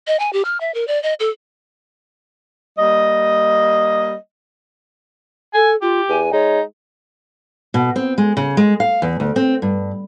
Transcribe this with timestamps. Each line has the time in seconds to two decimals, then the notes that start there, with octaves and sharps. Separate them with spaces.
0.07 D#5
0.20 G#5
0.33 G4
0.45 F6
0.60 E5
0.74 A#4
0.88 D5
1.03 D#5
1.20 A4
2.78 G3 A#3 D#5
5.54 A4 G#5
5.82 F4 G4
6.09 E2 G#5
6.33 G#3 D#4 C#5
7.74 B2
7.96 C4
8.18 G#3
8.37 C#3
8.57 G#3
8.80 F5
9.02 E2
9.20 D2
9.36 C4
9.62 G2